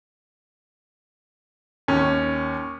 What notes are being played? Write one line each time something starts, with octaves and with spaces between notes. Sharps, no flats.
D#2 C#4